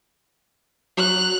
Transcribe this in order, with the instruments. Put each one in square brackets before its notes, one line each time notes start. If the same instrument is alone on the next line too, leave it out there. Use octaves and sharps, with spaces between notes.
[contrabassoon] F#3 [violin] F#6 F7